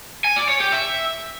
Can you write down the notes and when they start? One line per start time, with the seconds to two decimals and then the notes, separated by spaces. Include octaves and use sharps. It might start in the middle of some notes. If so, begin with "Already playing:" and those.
0.24 G#5
0.36 D5
0.48 C#5
0.60 G4
0.72 E5